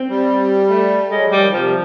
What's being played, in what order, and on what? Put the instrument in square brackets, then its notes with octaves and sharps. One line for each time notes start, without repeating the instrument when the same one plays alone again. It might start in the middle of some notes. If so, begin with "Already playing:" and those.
Already playing: [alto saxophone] C4
[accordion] G3
[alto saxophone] A3
[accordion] F#3 [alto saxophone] G#3
[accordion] F3
[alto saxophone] G3
[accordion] D#3
[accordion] C3 [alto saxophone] F3